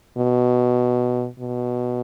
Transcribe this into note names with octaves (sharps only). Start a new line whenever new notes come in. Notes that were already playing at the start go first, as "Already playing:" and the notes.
B2
B2